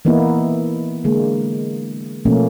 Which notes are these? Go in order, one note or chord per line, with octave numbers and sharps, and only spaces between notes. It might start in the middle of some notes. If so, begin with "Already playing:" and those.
E3 A#3 B3 D#4 E4
D3 G#3 A#3
B2 F3 A3 A#3 C#4